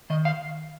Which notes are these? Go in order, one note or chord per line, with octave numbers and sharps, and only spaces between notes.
D#3 D#5
F5